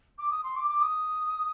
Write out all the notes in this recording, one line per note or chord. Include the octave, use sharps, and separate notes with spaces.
D6
D#6
C6
D6
D6
D#6